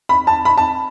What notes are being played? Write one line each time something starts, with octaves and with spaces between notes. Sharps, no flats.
B5
A5
B5
A5